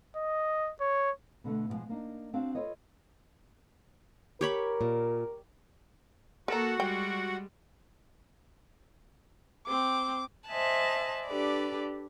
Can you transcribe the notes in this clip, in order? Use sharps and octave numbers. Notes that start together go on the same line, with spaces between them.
D#5
C#5
B2 D3 A3
B2 D3 F3 G#3
A#3 D4 D#4
C4 D4 F#4 F5
F4 A4 B4 C#5 D#5
G4 A#4 C#5 B5
A#2
A#3 F#4 A4 A#4 F#5 A#5
G3 G#3 G5
C4 D6
C5 D#5 E5 G#5 A5 F#6
D4 G4 A4 B4 D5